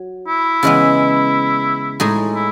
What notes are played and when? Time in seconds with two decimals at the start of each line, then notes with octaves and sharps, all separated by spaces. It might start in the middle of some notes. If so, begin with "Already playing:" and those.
Already playing: F#3
0.28 E4
0.63 C#3 E3 G#3 B3
2.00 A2 G#3 D#4 G#4
2.34 E4